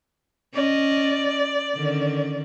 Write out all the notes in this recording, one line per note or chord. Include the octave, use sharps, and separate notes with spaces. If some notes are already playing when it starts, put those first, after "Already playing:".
C#4 D5 D#5
D3 D#3 C#4